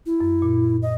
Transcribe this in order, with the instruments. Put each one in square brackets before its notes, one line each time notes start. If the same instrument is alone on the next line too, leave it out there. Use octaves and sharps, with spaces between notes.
[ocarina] E4
[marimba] F#2
A#2
[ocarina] D#5